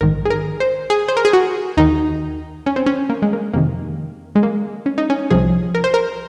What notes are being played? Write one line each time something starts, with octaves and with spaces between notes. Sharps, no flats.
A#1 G#2 D#3 A#4
G#4
A#4
C5
G#4
C5
A#4
G#4
F#4
D#2 D#3 D#4
C#4
C4
C#4
A#3
G#3
A#3
F2 C3 D#3 A#3
G#3
A#3
C#4
D#4
C#4
C2 C3 F3 G#4
A#4
C5
A#4